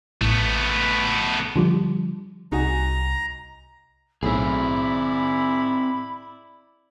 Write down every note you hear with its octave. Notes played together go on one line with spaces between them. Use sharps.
A1 A3 B3
D3 F3 G3
C2 D#4 F#4 G#5 A#5
B1 A2 C4 E4 G#4 D5 B5